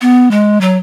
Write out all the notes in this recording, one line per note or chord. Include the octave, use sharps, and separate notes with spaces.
B3
G#3
F#3